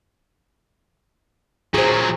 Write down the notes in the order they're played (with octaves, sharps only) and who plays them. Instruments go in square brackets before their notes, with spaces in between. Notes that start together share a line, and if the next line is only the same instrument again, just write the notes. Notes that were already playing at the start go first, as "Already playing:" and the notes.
[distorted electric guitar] A#2 F#3 [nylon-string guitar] G#4 C5